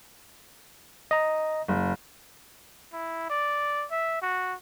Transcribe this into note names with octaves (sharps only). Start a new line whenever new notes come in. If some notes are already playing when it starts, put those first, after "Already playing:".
D#5 A#5
F#1
E4
D5
E5
F#4